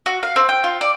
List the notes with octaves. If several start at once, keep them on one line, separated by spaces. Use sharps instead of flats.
F#4
F5
C4
G5
F4
D5